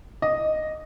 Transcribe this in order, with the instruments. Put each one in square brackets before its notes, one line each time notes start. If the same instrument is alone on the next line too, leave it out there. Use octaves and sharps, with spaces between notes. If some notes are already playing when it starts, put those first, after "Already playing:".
[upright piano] D#5